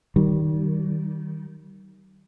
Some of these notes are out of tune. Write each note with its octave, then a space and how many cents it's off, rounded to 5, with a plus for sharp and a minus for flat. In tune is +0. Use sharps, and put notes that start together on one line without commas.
D#3 +0 G3 -30